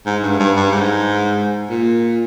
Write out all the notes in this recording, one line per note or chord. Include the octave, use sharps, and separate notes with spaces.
G#2
G2
G2
G2
G#2
A#2